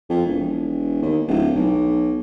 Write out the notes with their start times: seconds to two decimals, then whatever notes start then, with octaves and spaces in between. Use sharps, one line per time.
0.10 F2
0.26 E1
1.02 D#2
1.28 D1
1.55 B1